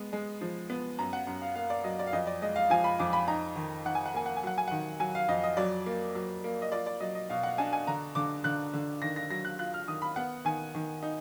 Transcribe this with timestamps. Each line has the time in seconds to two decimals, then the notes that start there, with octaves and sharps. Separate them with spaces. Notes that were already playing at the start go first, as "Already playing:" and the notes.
Already playing: G#3 B3
0.13 G#3
0.41 F3
0.70 B3
0.99 F#2 A#5
1.13 F#5
1.27 F#2
1.42 F5
1.55 A#3 F5
1.70 D5
1.84 F#3 D#5
1.99 D5
2.07 F5
2.13 F2 D#5
2.27 D5
2.42 G#3 D#5
2.56 F5
2.70 F3 G#5
2.84 B5
2.99 F2 D6
3.13 B5
3.28 D#4 A#5
3.56 D#3
3.85 D#3 F#5
3.95 G#5
4.06 F#5
4.14 A#3 G#5
4.26 F#5
4.37 G#5
4.43 F#3 F#5
4.58 G#5
4.68 D#3 F#5
5.00 F#3 G#5
5.15 F5
5.28 F2 D#5
5.44 D#5
5.57 F#3 D5
5.86 A#3
6.15 F#3
6.44 A#3
6.62 D#5
6.72 F4 D5
6.86 D5
7.00 F#3 D#5
7.15 D#5
7.30 B2 F5
7.43 F#5
7.58 D4 G#5
7.73 G#5
7.87 D3 A#5
8.15 D3 D6
8.44 D3 F#6
8.73 D3
9.02 D#3 A#6
9.16 A#6
9.30 F#3 A#6
9.45 F#6
9.59 F4 F#6
9.74 F6
9.88 D#3 D#6
10.02 B5
10.16 B3 F#5
10.45 D#3 G#5
10.75 D#3
11.03 D#4